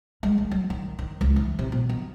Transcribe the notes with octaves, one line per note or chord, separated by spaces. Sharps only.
G#3
D#3
F#3
D#3
D#3
C#2
E3
C3
B2
D#3